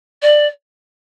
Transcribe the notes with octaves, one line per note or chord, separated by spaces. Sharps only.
D5